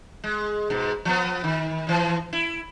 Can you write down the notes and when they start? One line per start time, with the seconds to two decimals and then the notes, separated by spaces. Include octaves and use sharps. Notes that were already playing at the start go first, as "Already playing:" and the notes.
0.24 G#3
0.70 G#2 B2
1.05 F3 B3
1.44 D#3
1.87 E3 F3
2.33 E4